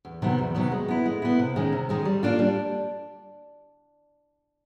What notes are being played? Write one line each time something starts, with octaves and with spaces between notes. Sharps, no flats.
E2
C3 D#3 F#3 B3
E2
C3 D#3 F#3 B3
G#3
B3 E4
G#3
B3 E4
C3
D#3 G#3 C#4
C3
D#3 G#3 C#4
G3
A#3 D4 F4
G3